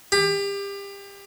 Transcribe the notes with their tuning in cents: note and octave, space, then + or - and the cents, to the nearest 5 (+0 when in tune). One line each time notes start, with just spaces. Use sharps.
G4 +30